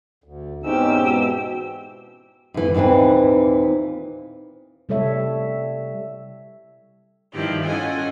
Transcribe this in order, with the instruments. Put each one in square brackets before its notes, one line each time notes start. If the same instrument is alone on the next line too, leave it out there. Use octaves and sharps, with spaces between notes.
[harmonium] D2
[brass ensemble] E2 G#2 [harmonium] C4 C#4 D#4 [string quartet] G4 E6
[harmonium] B2
[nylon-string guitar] F#2 E3
D#2 A#2 E3 C4 B4
[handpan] C3 G3 A4 C#5 E5
[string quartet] G2 D#3 F3 E4 G4
C#4 F4 A4 D#5 F#5 G#5